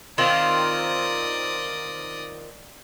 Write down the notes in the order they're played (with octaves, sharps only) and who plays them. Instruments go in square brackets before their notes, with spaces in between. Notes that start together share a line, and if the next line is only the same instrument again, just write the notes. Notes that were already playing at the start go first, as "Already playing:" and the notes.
[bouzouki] D#3 C4 F4 [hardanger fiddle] D5 D#5